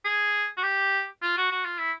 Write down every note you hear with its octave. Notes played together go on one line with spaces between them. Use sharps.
G#4
F#4
G4
F4
F#4
F#4
F4
E4